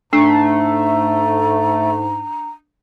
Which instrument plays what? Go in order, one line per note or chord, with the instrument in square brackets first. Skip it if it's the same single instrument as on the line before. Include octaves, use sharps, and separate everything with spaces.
[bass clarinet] G#2 [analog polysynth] A3 [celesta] D4 C7 [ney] A#5